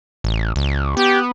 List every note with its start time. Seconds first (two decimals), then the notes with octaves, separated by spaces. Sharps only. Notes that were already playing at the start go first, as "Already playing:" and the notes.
0.24 A1
0.56 C#2
0.97 B3 G4